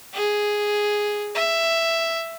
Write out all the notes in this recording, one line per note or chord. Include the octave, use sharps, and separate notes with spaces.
G#4
E5